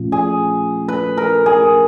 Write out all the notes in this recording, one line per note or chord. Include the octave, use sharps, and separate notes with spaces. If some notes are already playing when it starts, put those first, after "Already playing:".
Already playing: A#2 F3 A3 C#4 F4
G#4
B4
A#4
G#4